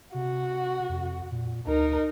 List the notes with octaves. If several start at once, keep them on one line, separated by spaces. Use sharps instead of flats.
C3 F#4
F2
A#2
D2 D#4 A#4